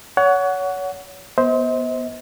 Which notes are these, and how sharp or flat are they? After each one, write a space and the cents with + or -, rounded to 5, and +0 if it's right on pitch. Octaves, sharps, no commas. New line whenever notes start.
C#5 +30 F#5 +0
B3 -15 C5 +0 D#5 +45